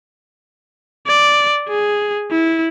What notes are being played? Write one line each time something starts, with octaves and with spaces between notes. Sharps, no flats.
D5
G#4
E4